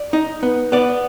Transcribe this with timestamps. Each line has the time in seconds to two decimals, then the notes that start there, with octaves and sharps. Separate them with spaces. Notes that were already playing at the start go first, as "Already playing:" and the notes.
Already playing: D5
0.13 D#4
0.43 B3
0.72 B3 D5